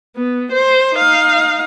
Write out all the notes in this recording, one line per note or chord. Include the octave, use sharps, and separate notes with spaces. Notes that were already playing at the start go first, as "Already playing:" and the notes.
B3
C5
D#4 F5